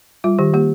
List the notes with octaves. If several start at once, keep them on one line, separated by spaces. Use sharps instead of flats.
G3 F4
D#3 G4
A#3 G4